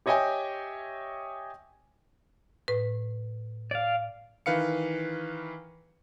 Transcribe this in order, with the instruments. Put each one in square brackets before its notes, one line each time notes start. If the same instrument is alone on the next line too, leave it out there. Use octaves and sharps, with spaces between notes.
[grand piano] G4 C#5 D#5 E5 G5 G#5
[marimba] A2 B4
[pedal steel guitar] D5 F5
[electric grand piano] D#3 E3 B4 F5 C#7